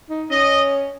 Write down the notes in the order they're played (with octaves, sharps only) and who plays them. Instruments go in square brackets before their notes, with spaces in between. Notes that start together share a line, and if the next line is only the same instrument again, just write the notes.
[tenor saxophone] D#4
[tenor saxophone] C#4 [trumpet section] D#5